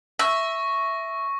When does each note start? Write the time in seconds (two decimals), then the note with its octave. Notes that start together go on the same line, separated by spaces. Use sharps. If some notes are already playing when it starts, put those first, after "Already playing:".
0.19 E5 C#6 A#6